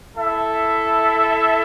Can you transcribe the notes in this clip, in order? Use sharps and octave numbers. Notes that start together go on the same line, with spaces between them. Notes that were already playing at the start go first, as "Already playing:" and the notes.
E4 A4 E5